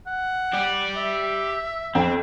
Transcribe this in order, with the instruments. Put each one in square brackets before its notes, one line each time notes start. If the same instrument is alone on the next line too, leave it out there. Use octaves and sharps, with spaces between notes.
[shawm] F#5
[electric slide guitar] G4 D5
[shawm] E5
[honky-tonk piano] F2 G5 [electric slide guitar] C4